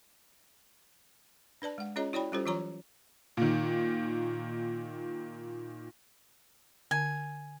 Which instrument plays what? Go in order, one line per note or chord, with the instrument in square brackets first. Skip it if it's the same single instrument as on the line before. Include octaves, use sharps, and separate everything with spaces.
[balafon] D4 B4 D5 A5
G#3 F#5
C#4 F4 G#4 C#5 D#5 A#5
E4 F#4 C#5 D5 G5 B5
G3 C#4 F4 G4 A4 C5
E3 F#3 F4 C#5 A#5 C#6
[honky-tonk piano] A#2 D#3
[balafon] D3 [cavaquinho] G#5